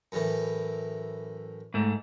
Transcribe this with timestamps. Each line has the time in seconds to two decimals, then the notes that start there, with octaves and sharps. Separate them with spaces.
0.12 F#2 A2 E3
1.74 G#2 A3